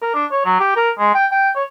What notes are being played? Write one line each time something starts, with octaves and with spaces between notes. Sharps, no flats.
A#4
D4
C#5
F#3
G4
A#4
G#3
G5
G5
C#5